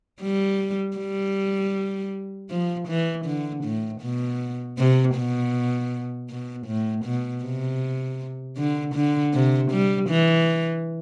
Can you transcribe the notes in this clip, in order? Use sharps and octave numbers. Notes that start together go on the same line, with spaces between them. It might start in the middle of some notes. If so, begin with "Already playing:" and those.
G3
G3
F3
E3
D3
A2
B2
C3
B2
B2
A2
B2
C3
D3
D3
C3
G3
E3